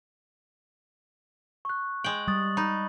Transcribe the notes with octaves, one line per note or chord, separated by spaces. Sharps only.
C#6 F#6
G#3 G5 F#7
G3 C#6 D#6 A6
D#4 B5